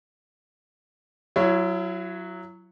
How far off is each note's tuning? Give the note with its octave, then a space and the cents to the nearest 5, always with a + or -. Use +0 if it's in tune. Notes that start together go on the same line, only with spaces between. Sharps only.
F#3 +0 E4 +35 C#5 +0